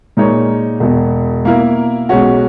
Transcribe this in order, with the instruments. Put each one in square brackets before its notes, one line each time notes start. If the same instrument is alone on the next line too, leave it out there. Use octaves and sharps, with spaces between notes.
[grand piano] A#2 G#3 D#4 A#4 C#5
E1 E2 B2
B2 A#3 E4 A#4
B1 B2 G#3 C#4 F#4